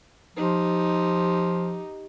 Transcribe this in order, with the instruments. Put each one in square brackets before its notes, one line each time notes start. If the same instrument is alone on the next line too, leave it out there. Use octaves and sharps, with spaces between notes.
[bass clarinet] F3 [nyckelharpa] D#4 G4